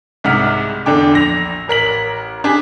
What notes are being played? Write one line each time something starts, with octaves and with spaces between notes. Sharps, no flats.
C2 G#2 C3 F#5 F6 B6
E2 D3 D4 G5 D6
A#1 A#6 F7
A1 A#4 B6 F#7
D4 G4 G#4 G#5